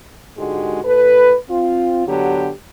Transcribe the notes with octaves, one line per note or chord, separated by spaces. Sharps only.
G#2 D3 G#3 F#4 G4
A2 A4 B4
C4 F4
D3 F#3 B3 G4